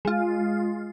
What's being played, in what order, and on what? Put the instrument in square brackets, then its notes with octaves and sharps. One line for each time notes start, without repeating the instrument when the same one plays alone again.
[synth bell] G#3 F4